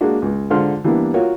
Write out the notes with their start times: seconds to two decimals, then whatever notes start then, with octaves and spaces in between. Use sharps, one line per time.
0.01 G#3 A#3 D4 F#4
0.22 C#2
0.50 G#2 D3 F4 C5 C6 F6
0.84 E3 G3 A#3 B3 D4 E4
1.14 F4 F#4 A#4 C#5